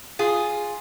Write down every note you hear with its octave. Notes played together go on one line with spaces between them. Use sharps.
F4 G#4